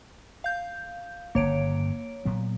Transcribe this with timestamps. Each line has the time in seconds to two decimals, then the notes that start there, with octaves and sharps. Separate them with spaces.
0.44 F5 G6
1.35 G1 G2 C#3 A#3 C#5 D7
2.25 A#2 F#3 B3